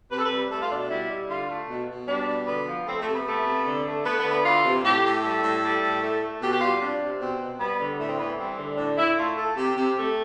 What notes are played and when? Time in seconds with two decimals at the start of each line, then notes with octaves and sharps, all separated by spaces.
0.11 C3 B4
0.18 A4
0.25 B4
0.31 G3
0.50 A3 A4
0.61 F4
0.69 B2 D4
0.79 D4
0.89 G3 E4
1.09 G3
1.29 D3 F4
1.49 A3
1.69 B2
1.88 B2
2.07 G3 D4
2.27 B2
2.47 D3 B3
2.67 F3
2.86 A3 C4
3.00 A3
3.07 C3
3.14 B3
3.26 A3
3.46 C3
3.66 D3
3.86 A3
4.05 A3 B3
4.18 B3
4.24 D3
4.31 B3
4.44 E3 F4
4.64 C3
4.84 A2 G4
5.04 A2
5.23 G3 A4
5.43 A2
5.63 G3
5.82 A2
6.02 A3
6.21 A3
6.41 B2 G4
6.52 G4
6.61 G3 F4
6.81 C3 D4
7.00 C3
7.20 B2 C4
7.40 B2
7.59 G3 B3
7.79 D3
7.99 A2 A3
8.08 C4
8.18 E3 B3
8.38 G3 C4
8.58 D3
8.77 A2 D4
8.97 A2 E4
9.17 A3 F4
9.37 A3 A4
9.56 C3 G4
9.76 C3
9.96 A3